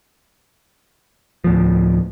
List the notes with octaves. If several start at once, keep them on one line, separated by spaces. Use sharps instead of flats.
D2 A2 F3